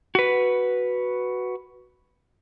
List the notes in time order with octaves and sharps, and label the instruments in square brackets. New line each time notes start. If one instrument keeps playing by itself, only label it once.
[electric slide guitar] F#4 B4